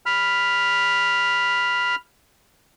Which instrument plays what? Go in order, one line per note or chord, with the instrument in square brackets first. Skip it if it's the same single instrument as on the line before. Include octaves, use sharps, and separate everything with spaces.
[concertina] B5 F6